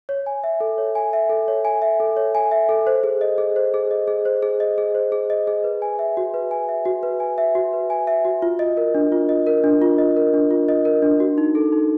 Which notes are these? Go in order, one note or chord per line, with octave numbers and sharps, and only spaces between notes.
C#5
G#5
E5
A4
C#5
G#5
E5
A4
C#5
G#5
E5
A4
C#5
G#5
E5
A4
C5
G#4
D#5
G#4
C5
G#4
D#5
G#4
C5
G#4
D#5
G#4
C5
G#4
D#5
G#4
B4
G#5
E5
F#4
B4
G#5
E5
F#4
B4
G#5
E5
F#4
B4
G#5
E5
F#4
F4
D#5
A#4
D4
F4
D#5
A#4
D4
F4
D#5
A#4
D4
F4
D#5
A#4
D4
F#4
D#4
A4
D#4